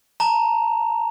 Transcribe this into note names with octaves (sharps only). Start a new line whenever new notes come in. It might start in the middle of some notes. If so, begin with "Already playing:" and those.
A5 A#5